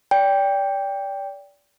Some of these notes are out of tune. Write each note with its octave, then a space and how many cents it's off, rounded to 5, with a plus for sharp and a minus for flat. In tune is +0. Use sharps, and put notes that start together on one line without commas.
D5 -30 G5 +10